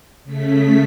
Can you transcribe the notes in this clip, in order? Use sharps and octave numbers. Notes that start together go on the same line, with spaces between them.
C#3 A3 B6